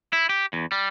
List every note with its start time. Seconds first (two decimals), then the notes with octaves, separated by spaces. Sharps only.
0.13 E4
0.29 G4
0.53 E2
0.72 G3